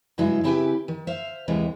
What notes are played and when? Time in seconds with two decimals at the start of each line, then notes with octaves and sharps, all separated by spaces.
0.18 G2 C#3 F#3 G#3 E4
0.44 C#3 C4 E4 G4 B4 G#5
0.88 D#3
1.07 C5 E5 F5
1.48 D#2 C3 E3 G#3